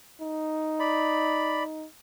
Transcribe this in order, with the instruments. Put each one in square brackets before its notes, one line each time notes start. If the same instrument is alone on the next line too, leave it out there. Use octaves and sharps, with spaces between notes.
[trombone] D#4
[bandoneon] D5 B5